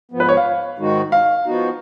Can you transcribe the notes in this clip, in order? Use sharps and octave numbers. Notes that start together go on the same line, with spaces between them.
G#2 F3 B3
B4
C#5
F5
G#2 D#3 G#3 D#4 F#4
F5
F3 B3 D#4 F#4